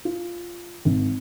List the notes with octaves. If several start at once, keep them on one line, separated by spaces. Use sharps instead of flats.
F4
G#1